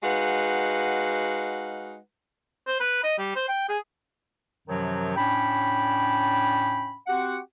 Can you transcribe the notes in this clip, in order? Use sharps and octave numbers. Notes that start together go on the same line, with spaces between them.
G#3 D#4 F#4 B4 F5 F#5
C5
B4
D#5
G3
C5
G5
G#4
F#2 C3 D#3 F3 F#3
A2 C#4 D4 G5 B5
C4 F#4 G4 F#5